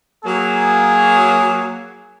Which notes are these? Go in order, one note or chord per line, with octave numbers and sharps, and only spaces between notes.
F#3 A#3 G#4